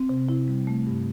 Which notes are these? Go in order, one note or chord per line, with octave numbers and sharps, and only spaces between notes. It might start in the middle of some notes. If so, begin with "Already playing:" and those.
Already playing: C4
C3
E4
G3
A3
G2